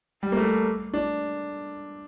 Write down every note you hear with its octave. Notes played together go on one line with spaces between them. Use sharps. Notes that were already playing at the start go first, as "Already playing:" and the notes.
G3
A#3
A3
D4